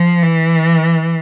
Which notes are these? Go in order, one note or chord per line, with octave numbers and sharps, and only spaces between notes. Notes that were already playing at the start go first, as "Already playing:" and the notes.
Already playing: F3
E3